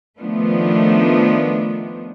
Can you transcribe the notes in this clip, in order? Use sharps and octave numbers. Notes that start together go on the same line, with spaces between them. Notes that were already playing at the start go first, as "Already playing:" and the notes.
D#3 F3 A3 B3 D4